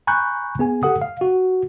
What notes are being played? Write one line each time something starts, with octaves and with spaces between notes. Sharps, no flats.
G#5 A#5 B5 C#6 F#6 G6
B3 G#4 G#5
G4 A4 F#5 D#6
F5
F#4